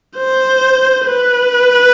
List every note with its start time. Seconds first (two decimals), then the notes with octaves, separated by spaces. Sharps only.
0.17 C5
1.06 B4